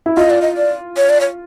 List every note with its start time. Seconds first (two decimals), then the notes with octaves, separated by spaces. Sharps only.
0.06 E4
0.17 F4 D#5
0.30 D5
0.42 D#5
0.57 D5
0.97 C#5
1.09 D5
1.20 C#5